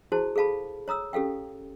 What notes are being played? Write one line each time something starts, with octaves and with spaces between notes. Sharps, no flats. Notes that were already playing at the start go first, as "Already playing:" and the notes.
E4 F#4 G#4 C5 A5
G#4 A4 F5 A5 B5
C#5 A#5 D#6 E6
C#4 G4 A4 F5 G5